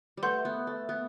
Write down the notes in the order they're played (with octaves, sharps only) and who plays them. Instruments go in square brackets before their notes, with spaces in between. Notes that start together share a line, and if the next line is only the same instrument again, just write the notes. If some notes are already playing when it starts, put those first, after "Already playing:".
[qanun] G3
[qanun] A3 [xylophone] B4 F#5 C6 G6
[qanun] B3
A3
B3